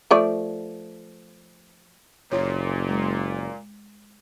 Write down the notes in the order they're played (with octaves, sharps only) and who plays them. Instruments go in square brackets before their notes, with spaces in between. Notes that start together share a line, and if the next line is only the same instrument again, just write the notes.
[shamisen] F3 A3 D5
[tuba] F#1 [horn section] A#2 [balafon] F4 C#5
[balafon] G#3